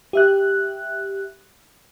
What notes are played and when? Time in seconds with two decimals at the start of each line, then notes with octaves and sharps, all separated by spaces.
0.13 G4 E5 F#6